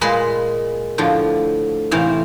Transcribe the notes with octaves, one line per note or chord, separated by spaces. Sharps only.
A#2 G#3 B4 B5 C6
A2 D3 F3
A2 C3 E3 C5 F5